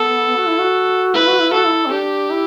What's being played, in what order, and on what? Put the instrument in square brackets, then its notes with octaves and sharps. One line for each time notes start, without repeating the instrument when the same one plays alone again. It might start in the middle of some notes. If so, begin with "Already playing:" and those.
Already playing: [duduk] B3 [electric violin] A4
[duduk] F#4
E4
F#4
[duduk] E4 [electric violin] B4
[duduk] F#4
E4
[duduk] F#4 [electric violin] A4
[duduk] E4
C4
[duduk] D4 [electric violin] G4
[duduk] E4